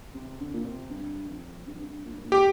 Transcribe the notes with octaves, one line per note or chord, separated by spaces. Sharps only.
C3
D3
A#2
C3
G2
F2
G2
F2
G2
A#2
G2
A#2
G4